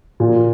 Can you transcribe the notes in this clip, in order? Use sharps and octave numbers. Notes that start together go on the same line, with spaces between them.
A#2